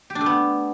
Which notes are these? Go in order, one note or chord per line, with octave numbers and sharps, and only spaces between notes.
G4
D4
A3
B3